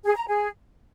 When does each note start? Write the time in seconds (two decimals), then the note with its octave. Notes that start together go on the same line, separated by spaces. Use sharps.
0.05 G#4
0.16 A#5
0.28 G#4